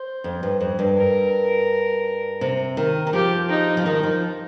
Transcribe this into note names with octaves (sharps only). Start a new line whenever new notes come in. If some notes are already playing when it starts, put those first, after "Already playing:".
Already playing: C5
F2
G2
F2
G2
A#4
C3
D#3
D#3
F3 G4
D#4
F3
D#3 D#4
F3